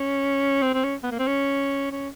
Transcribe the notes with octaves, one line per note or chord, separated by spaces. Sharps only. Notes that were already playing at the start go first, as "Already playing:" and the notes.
Already playing: C#4
C4
C4
C#4
B3
A#3
C4
C#4
C#4